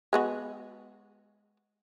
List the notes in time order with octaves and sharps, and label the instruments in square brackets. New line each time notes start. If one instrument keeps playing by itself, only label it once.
[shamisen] G#3 B3 F#4